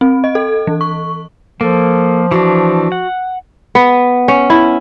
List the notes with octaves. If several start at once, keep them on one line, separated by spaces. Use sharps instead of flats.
C4
D#5
A4
E3
C#6
F3 A#3 A4
E3 D4 F#4
F#5
B3
C#4
E4